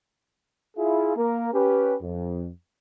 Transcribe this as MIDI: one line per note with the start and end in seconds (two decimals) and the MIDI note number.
0.77 1.14 64
0.77 1.14 65
0.77 1.14 68
1.16 1.50 58
1.16 1.50 70
1.53 1.96 61
1.53 1.96 67
1.53 1.96 71
2.02 2.49 41